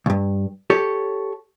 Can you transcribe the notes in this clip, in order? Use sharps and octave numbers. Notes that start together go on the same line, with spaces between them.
C#2 G2
G4 A4 C#5